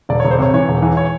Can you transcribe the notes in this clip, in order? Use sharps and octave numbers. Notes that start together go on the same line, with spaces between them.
E1 D5
C#5
E1
C5
C3 C#5
E3 C#5
E1
E3
C#5